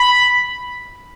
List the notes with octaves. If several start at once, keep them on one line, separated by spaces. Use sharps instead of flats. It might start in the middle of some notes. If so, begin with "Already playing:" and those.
Already playing: B5